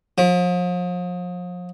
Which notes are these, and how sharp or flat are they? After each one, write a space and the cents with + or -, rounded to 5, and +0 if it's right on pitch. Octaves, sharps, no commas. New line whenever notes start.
F3 +40